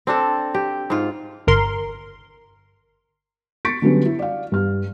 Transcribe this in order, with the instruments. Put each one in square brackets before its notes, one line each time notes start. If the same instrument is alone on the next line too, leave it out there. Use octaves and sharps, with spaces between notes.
[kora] C4 D4 A4
G4
G#2 F4
[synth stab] G1 A#4 C6
[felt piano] C#6 A6 B6 C#7 D7
D3 F#3 G3 B3 C#4
E4
D5 F5
G2 F6